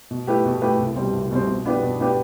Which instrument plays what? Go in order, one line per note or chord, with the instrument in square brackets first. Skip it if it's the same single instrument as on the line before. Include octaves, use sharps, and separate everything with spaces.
[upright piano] B2
A3 E4 G4 B4
B2
A3 E4 G4 B4
C2
B2 G3 C4
C2
B2 G3 C4
B2
B3 D4 G4 B4
B2
B3 D4 G4 B4